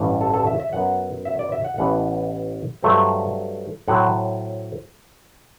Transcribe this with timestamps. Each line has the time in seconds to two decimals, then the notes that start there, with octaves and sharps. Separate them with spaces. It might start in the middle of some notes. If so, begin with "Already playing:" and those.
Already playing: A1 G2 E3 G3
0.21 A4
0.33 A4
0.47 E5
0.60 E5
0.73 F#2 F#3 B3 F#5
1.25 E5
1.39 D5
1.52 E5
1.65 F#5
1.78 A1 A2 E3 B3 F#5
2.83 G2 F#3 A3 C4
3.88 A2 F#3 C4 F#5